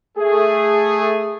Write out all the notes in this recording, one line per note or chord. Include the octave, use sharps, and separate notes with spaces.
A3 G#4